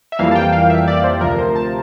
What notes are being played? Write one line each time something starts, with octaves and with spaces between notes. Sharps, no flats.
E5
F2 E3 G3 A#3 F5
A5
G5
F5
E5
D5
C5
D2 C3 F3 A#4
C5
A5